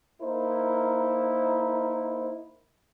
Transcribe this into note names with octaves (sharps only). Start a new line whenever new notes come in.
A#3 D#4 E4 A#4 C5